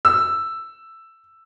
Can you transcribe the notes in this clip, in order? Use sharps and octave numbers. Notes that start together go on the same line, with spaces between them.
E6